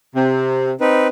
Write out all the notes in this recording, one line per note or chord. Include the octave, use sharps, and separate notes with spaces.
C3
C4 D#4 B4